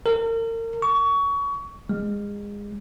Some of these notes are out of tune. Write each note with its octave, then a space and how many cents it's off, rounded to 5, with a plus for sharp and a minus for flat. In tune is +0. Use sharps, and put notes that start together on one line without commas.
A#4 -35
C#6 +25
G#3 -25